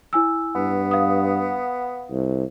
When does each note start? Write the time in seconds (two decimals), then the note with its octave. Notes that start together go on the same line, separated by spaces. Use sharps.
0.13 E4 G#5 E6
0.55 G2 B3
0.91 F5 D#6
2.11 C2